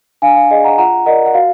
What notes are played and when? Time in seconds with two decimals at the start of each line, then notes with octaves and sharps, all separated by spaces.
0.22 D4 F5 G#5
0.36 F5
0.51 G#4 D5 D#5
0.65 F#5 A#5
0.78 F4 F#5 A#5
1.06 A#4 D5 D#5 F#5
1.26 F#5
1.34 F#4 F5